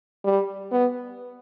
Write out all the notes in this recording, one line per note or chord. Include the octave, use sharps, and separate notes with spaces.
G3
B3